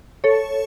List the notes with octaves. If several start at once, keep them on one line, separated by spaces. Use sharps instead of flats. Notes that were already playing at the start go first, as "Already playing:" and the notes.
A4 C#5